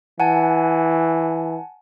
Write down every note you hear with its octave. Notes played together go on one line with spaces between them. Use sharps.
E3 F#5 G#5 A5